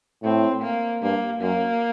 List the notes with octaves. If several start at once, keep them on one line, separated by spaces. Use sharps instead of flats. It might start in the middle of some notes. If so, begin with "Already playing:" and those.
A2 C4
A#3
G2 A#3
F#2 A#3